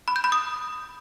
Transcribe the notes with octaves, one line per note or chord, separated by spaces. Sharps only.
B5
G6
B5
D#6